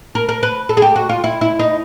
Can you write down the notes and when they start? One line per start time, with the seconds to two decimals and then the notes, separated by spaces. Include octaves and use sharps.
0.15 A#4
0.29 A#4
0.43 B4
0.69 A4
0.77 G#4
0.82 G4
0.96 F#4
1.09 F4
1.24 E4
1.41 E4
1.59 D#4